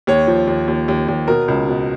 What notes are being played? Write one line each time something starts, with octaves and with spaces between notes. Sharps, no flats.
D#2 C#5
F3
D#2
D#2
D#2
D#2
B2 A#4
C#2
B2